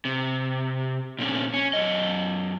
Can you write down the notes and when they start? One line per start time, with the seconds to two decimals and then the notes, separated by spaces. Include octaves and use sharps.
0.05 C3
1.19 A#2 D3 C4 C#4
1.54 C#4
1.73 F#2 D#5